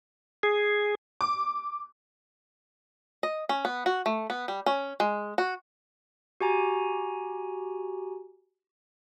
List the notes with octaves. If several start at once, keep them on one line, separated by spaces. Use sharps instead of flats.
G#4
D6
D#5
C#4
B3
F#4
A3
B3
G3
C#4
G#3
F#4
F#4 G4 G#5 A#5